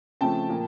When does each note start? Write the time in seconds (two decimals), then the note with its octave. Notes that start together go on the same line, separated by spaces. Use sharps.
0.21 C#3 F3 A3 C4 G5 A5
0.49 A#2 F3 A#3